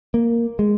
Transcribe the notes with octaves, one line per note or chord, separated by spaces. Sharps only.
A#3
G#3